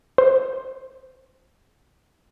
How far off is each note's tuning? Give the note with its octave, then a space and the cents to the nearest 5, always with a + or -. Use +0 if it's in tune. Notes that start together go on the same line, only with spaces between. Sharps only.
C5 +15